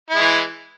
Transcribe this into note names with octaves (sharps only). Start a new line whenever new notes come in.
E3 G#3 E4